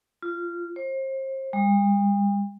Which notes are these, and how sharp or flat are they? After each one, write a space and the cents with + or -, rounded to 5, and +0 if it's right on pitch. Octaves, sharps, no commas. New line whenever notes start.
F4 -20
C5 +35
G3 +45